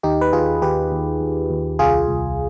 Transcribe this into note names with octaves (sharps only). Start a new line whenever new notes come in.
D#2 D#4 G4
B4
D#2 F4 G#4
D#2 G4 B4
D#2
D#2
D#2
C2 F4 G#4
C2